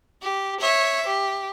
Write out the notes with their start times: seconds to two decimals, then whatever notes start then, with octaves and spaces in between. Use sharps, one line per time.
0.22 G4
0.60 C#5 E5
1.07 G4